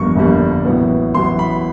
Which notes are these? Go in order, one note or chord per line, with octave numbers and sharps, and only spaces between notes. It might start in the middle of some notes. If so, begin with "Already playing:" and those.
Already playing: G1 F2 D3 G3 A#3 C#6
G1 F2 D3 G3 A#3
A1 A2 F#3 B3
A1 A2 F#3 B3 C6
B5